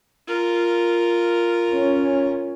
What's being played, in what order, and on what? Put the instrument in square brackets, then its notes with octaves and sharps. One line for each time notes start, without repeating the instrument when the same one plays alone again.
[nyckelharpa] F4 A#4
[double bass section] C#4